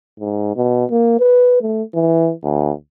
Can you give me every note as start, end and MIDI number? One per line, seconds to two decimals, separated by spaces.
0.20 0.53 44
0.56 0.85 47
0.91 1.18 58
1.19 1.57 71
1.61 1.83 57
1.94 2.32 52
2.43 2.72 38